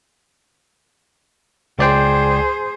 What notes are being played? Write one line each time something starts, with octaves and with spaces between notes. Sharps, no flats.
C#2 G#4 C5 D5 G5